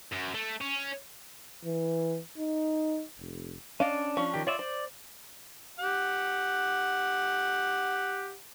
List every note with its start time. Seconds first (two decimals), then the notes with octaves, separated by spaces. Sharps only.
0.13 F#2
0.35 A3
0.61 C#4
1.64 E3
2.37 D#4
3.18 F1
3.80 C#4 D4 D5 D#5 F5
4.17 F3 C#4 D4 C#6
4.34 D#3 G4
4.47 F4 C#5 D5 E5
4.59 C5 D5
5.80 G4 F#5